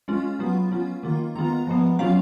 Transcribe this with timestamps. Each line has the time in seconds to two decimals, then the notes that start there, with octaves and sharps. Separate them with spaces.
0.08 G#3 C#4 F4
0.39 F#3 B3 F4
0.71 F#3 C#4 F4
1.03 D#3 A#3 F4
1.35 D#3 G#3 B3 F4 A#5
1.67 F3 G#3 B3
1.99 F#3 C#4 F4 F5